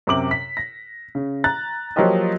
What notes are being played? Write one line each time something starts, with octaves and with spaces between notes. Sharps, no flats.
F#2 C3 D6 F#7
B6
A#6
C#3
A#5 F#6 A6
F3 F#3 A#3 F4 G4 D#5